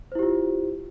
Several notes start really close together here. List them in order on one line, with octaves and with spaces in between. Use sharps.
C5 E4 G4 F4